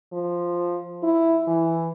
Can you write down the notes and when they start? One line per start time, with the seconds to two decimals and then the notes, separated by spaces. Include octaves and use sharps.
0.13 F3
1.03 E4
1.47 E3